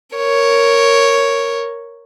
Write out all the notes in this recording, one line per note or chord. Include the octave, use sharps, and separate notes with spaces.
A#4 C#5